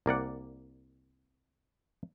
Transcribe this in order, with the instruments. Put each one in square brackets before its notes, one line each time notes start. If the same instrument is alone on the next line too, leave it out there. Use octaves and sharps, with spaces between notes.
[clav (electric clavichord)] C2 A#3 D5 F#5